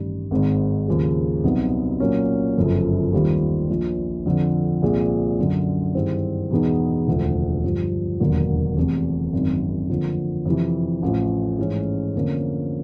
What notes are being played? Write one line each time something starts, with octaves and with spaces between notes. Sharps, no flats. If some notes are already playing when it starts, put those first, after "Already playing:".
Already playing: A1 G2 D#3 G3
G#1 G#2 D#3
D#2 C#3 F3 G#3
C2 B2 F#3 B3 D#4
A#2 F#3 A#3 C#4
G1 F#2 C#3 F3
D#2 D#3 G3 C4 F4
A#1 A#2 F3
F2 D3 F3
C2 A#2 F3 G#3
F#2 D3 F#3
G2 D#3 G#3 C4 E4
E2 B2 G#3 B3 D#4
E1 D2 C#3 F3
G2 D3 F3
E1 D#2 D3 F#3 A#3
F1 E2 C3
G#1 F#2 D#3
F2 D3 F3 A#3
F2 C3 E3
A1 A2 F3
G#2 E3 A3 C#4
F2 D3 F3 A#3 C#4